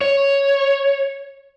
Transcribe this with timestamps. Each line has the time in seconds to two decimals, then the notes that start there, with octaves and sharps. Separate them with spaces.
0.01 C#5